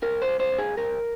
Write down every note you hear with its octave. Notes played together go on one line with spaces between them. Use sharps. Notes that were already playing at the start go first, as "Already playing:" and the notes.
C2 A#4
C5
C2
C5
C2
G#4
C2 A#4